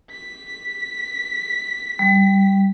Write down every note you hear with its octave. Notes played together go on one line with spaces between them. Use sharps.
B6
G3